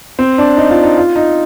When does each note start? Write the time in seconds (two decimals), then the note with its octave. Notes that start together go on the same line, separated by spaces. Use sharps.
0.19 C4
0.38 D4
0.57 D#4
0.70 F4
0.83 D#4
0.97 F4
1.16 D#4